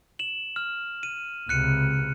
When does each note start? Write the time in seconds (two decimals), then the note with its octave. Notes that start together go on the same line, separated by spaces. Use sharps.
0.19 E7 F#7
0.56 F6
1.03 D#7
1.49 C#2 C3 F#6 C#7 D#7